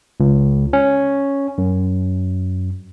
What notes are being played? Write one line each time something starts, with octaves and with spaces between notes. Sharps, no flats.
C#2
C#4
F#2